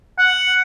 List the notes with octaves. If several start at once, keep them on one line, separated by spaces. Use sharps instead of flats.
F#5